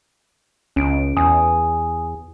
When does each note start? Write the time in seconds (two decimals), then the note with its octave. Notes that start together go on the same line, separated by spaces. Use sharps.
0.76 C#2 C#4 D7
1.17 E2 G#5 D#6